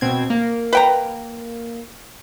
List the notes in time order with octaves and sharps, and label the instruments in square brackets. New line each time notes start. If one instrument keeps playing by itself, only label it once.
[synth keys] B2 C4 G#6
A#3
[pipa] B4 G5 A#5